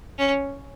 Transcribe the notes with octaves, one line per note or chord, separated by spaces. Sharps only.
C#4